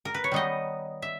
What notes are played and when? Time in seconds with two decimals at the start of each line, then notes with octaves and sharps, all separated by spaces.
0.05 A#4
0.14 B4
0.24 C#5
0.32 D#3 G3 B3 D#4 D#5
1.02 E5